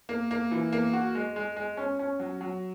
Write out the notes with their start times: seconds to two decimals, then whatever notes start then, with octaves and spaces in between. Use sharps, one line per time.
0.09 A#3
0.31 A#3
0.51 E3
0.73 A#3
0.93 F#4
1.15 G#3
1.36 G#3
1.56 G#3
1.77 C#4
1.99 C#4
2.20 F#3
2.41 F#3